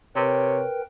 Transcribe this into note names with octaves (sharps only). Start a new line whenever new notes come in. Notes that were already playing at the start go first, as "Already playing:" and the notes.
C3 A#4 B4 C#5 G5